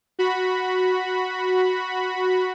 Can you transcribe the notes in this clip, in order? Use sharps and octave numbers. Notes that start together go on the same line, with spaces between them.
F#4 B5